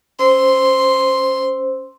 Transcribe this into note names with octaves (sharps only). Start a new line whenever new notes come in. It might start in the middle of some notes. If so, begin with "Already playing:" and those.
C#4 C5 C6 E6